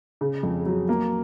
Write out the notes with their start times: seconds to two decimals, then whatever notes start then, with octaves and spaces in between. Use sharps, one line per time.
0.21 C#3
0.43 F2
0.66 F#3
0.89 A#3